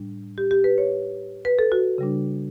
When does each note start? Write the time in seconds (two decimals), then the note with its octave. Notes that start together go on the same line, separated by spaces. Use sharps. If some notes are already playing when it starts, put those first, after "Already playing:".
Already playing: A2 G3 D4
0.38 G4
0.51 G4
0.64 B4
0.78 C#5
1.45 B4
1.59 A4
1.72 F#4
1.98 C#3 G3 D4